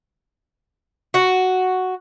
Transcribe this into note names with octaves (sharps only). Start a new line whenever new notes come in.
F#4